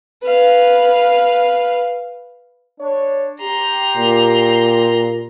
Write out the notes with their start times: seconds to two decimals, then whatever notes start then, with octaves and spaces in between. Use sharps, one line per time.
0.23 B4 F5
2.80 D4 C#5
3.41 G4 A#5 C6
3.97 A#2